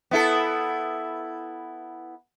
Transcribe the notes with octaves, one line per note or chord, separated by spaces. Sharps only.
B3 E4 A4